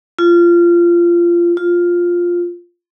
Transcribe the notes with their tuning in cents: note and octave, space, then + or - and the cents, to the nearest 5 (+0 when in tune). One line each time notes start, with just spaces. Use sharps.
F4 -20
F4 +5